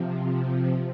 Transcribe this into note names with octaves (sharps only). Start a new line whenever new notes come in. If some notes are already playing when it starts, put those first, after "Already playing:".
Already playing: C3 F3